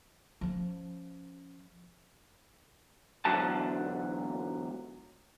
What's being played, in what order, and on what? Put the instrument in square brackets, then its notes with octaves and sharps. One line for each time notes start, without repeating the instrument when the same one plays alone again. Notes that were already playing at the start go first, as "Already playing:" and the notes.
[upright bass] F3 C#4
[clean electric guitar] E2 G#2 D3 F#3 A5